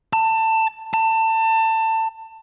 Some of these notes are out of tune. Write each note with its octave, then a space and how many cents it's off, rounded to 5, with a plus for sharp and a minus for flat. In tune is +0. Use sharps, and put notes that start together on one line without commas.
A5 +20
A5 +25